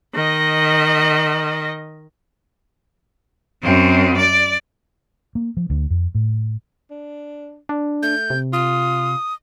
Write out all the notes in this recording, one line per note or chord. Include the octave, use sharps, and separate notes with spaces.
D#3 D#5
F#2 C4
D5
A#3
F3
D2
F2
A2
D4
D4
A3 G6
C3
F4 D#6